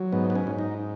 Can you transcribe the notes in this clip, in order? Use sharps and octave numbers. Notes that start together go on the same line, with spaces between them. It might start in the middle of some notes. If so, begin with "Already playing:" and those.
Already playing: F#3
G#2 B3
B3
C#4
G#2
D#4